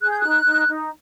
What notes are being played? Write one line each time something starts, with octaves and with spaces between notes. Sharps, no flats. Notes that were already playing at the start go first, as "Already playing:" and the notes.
G#4 F#6
G6
D#4 F#6
D#4
D#4